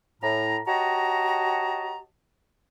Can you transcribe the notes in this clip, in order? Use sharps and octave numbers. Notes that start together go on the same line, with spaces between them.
A2 A#5
F#4 G4 C#5 D#5 A5 A#5